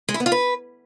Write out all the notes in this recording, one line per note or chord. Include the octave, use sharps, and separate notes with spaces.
G#3
E4
B3
F4
B4